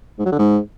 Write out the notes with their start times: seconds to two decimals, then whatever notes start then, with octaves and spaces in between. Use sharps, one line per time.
0.19 G#2
0.25 F#3
0.32 D3
0.39 G#2